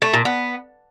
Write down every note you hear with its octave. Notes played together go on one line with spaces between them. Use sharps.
A3
A#2
B3